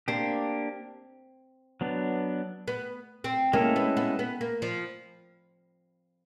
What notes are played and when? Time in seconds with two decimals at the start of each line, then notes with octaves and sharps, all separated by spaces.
0.08 A#3 C4 D4 G4
1.81 F#3 B3 D4
2.68 B3
3.24 C4
3.53 G#3 A#3 C#4 E4 A4
3.76 B3
3.97 B3
4.19 B3
4.41 A#3
4.62 F3